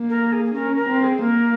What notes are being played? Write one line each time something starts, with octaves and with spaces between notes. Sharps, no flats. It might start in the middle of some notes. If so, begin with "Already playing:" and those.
Already playing: A#3
A#4
G#4
G#4
C#4 A#4
A#4
C4
A#4
G#4
A#3 A#4